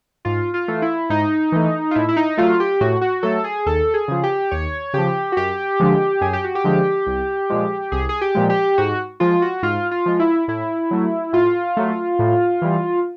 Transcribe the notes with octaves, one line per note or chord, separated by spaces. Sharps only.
G#2 F4
F4
E3 A3
E4
G#2 D#4
E3 A3
F4
A2 E4
E4
D#4
F#3 A3 F4
G4
A2 F#4
F#4
F#3 A3 A4
G#4
D#2 A4
G#4
C#3 F3
G4
D#2 C#5
C#3 F3 G4
F#4
F#2 G4
D3 F3 G#3
F#2 G#4
G4
F#4
G4
D3 F3 G#3
C2
A#2 F3 G#3
C2 G#4
G#4
G4
A#2 F3 G#3
G4
G#2 F#4
F3 G#3 F4
F#4
G#2 F4
F4
F3 G#3
E4
A2 E4
F#3 A3
A2 F4
F#3 A3
A2
E3 G3